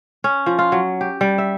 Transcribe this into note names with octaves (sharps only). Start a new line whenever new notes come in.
C#4
F3
F4
F#3
G4
G3
E5